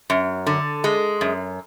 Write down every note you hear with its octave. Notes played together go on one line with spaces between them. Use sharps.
F#2
D3
G#3
F#2